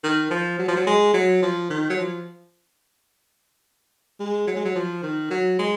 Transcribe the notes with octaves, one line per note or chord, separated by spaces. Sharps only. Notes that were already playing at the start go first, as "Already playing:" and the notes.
D#3
F3
F#3
F3
F#3
G#3
F#3
F3
D#3
F#3
F3
G#3
F#3
G#3
F#3
F3
D#3
F#3
G#3